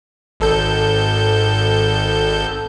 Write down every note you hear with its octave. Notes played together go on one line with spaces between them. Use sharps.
G#1 A4 G6